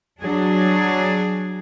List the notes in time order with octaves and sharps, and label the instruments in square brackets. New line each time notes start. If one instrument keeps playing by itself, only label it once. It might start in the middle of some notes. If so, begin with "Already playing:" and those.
[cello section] F#3 D4 G#4